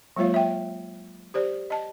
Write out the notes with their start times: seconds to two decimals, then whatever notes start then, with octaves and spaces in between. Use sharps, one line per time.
0.16 F#3 G#3 A#3 F4 C#5 F5
0.34 E5 G5
1.34 G4 C5 D5
1.70 D#5 A5